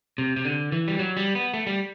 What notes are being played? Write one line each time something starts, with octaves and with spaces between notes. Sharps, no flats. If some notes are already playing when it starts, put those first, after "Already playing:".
C3
C3
D3
E3
G3
F#3
G3
B3
A3
G3